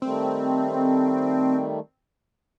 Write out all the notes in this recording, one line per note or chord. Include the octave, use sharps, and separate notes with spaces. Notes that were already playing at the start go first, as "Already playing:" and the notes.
D#3 G3 A3 C4